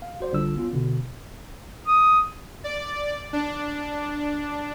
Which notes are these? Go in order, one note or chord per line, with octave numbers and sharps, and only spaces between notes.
F5
F#4 C5 D5
A#1 D3 G3 D4 F4 E6
B3 C#4 F4
B2 D3
D#6
D5
D4